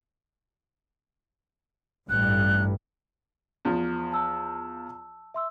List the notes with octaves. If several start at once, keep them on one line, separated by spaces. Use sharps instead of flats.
A1 G2 F#6
E2 F3
A5 E6
E5 C6 E6